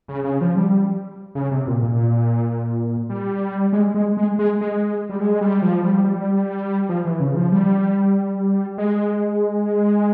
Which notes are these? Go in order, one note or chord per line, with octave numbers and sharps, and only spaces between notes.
C#3
C#3
F3
G3
C#3
C3
A#2
A#2
G3
G#3
G#3
G#3
G#3
G#3
G3
G#3
G3
F3
G3
G3
F3
E3
C#3
F3
G3
G#3